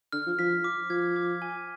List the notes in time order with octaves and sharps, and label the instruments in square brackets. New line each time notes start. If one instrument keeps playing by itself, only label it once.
[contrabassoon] D3 [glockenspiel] F6
[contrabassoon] F3
[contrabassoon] F3 [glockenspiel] B6
[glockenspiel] D6
[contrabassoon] F3 [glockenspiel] G#6
[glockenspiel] D6
G#5